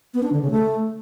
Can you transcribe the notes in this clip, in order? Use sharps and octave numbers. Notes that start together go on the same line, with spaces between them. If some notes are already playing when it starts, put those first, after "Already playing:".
B3
D4
D3
C#3
A3